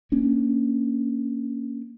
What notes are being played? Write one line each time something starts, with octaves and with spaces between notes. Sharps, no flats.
A#3 C#4 D4